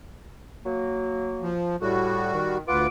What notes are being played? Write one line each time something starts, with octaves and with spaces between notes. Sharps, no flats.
F#3 A#3
F3
A2 G3 F#4
D#3
D2 F4 B4 F5 F#5 D6